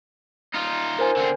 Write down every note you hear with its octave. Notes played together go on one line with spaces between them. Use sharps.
D#4 F4
A#4 C5 G#5
D3 C4